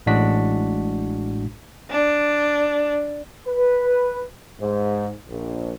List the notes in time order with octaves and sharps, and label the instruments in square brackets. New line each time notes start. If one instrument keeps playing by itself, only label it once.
[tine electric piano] A1 A2 G#3 D4 F#4 B6
[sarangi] D4
[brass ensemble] B4
G#2
A#1